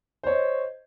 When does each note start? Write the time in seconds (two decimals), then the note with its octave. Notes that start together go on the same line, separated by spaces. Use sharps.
0.23 C5
0.27 C#5
0.30 D#5